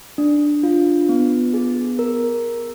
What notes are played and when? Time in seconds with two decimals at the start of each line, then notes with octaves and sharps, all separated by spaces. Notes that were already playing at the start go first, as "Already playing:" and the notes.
0.18 D4
0.63 F4
1.09 B3
1.54 G#4
1.99 A#4